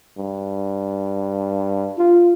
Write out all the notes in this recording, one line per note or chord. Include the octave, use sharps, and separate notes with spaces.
G2
F4